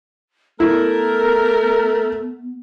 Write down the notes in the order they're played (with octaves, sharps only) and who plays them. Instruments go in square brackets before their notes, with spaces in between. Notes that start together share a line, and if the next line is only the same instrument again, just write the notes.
[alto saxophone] A3 [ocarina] B3 [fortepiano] E4 [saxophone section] A#4